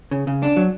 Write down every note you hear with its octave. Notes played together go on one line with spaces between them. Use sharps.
C#3
C#3
D4
F#3